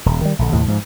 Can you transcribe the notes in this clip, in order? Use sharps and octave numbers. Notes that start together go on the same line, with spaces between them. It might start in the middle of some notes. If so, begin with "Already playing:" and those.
D#1
D#3 G3
A#1 D3
D#2 A2 C3
G#2 F3